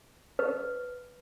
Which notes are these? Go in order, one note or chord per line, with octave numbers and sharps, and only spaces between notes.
B4